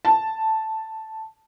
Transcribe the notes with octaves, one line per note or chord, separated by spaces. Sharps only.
A5